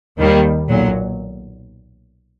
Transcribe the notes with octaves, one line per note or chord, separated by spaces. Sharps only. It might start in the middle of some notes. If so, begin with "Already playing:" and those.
D#2 D#3 G3 A#3
B1 A#2 F#3